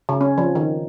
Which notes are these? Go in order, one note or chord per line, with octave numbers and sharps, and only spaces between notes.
C#3
C#4
F3
D#3